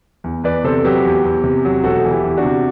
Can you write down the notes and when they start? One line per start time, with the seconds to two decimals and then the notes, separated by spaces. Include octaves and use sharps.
0.24 E2
0.44 E2 B4 D5
0.64 C3 A4 C5
0.84 F#3 G4 B4
1.05 E2
1.24 E2
1.44 C3
1.65 F#3
1.84 E1 F#4 A4
2.05 E3
2.11 E4 G4
2.24 E2
2.37 D4 F#4
2.45 C3